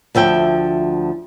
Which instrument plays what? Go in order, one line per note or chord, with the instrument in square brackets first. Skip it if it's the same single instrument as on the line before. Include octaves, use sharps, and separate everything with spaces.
[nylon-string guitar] D2 F3 E5 G5